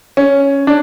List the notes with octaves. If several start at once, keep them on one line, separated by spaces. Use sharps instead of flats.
C#4
D4